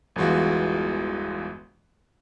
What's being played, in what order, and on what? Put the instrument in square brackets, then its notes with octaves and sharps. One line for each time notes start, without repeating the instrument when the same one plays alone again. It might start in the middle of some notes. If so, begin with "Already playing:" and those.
[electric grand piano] G1 E2 E3 G#3 F4 F#4